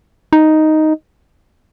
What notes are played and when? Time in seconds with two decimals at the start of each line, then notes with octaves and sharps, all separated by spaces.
0.33 D#4